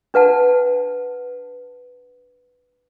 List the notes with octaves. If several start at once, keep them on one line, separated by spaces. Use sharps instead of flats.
D4 B4 F#5 A5